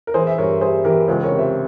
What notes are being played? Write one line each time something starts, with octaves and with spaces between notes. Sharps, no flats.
A#4
E3 G#4 C5
E5
G2 A#4 C#5
G3 G#4 C5
E3 G4 A#4
C#2 G#4 C5
A#4 C#5
C3
C5 E5